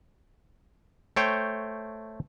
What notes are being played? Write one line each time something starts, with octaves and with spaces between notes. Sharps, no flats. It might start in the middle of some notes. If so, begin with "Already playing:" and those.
A3 C5 C#5 G5